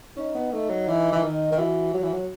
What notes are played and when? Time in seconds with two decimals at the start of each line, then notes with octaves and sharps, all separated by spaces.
0.17 C#4 D#4
0.35 B3
0.52 A3 D#4
0.69 F#3
0.88 E3
1.12 E3
1.23 D#3
1.52 D#3
1.58 E3 F#4
1.93 F#3 F#4
2.03 E3
2.13 F#3